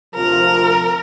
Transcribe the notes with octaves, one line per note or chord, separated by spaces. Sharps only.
D2 C3 F3 A#4